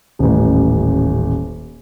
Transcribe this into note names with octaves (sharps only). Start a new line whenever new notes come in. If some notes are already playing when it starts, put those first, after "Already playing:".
D#1 A1